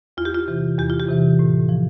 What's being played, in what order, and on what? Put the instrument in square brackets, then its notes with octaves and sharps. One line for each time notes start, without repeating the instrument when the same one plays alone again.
[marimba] E2 F4
G4
F4
C3 E3
E2 G4
F4
G4
C3 E3
A2
F3